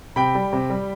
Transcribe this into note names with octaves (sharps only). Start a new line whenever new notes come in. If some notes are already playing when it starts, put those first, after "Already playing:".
C3 G5 B5
G3
C3
G3